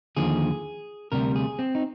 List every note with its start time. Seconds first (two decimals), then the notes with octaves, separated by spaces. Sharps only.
0.17 D#2 D3 F3 G#4
1.12 D2 C3 G3 A#4
1.36 G#4
1.59 C4
1.75 D#4